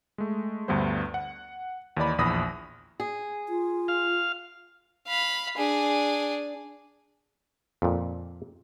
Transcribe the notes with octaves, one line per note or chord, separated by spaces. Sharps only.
G#3 A3
D2 G2 G3 B3 B4 C5
F#5
D#2 E3 D#4 D5 B5
A#1 E2 B5 D#6 A#6
G#4
F4
F5
F5 B5
D4 G#4
F2 A#2